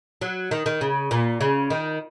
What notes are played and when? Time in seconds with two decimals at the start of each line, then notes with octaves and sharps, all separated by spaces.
0.21 F#3
0.51 D#3
0.66 D#3
0.81 C#3
1.11 A#2
1.41 C#3
1.70 D#3